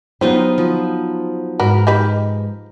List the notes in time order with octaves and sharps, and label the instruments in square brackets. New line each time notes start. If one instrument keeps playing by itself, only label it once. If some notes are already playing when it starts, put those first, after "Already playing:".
[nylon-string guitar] F#3 C5 [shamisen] G3 [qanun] B3 D#4 F4
[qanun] F3
[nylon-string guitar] G#2 [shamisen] F#4 B4 [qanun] A#4
[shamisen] D#4 G4 B4